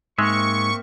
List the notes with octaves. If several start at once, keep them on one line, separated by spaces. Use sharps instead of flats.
G#2 G#3 A#3 C4 E5 C#6